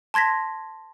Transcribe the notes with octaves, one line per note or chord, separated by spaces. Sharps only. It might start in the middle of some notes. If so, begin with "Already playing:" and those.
A5 C6 G#6 A#6 B6